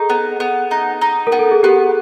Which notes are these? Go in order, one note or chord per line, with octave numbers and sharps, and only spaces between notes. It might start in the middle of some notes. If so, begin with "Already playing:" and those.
Already playing: D#4 G#4 A4
B3
B3
D#4
D#4
A#4
B3
A4
G#4
B3 G4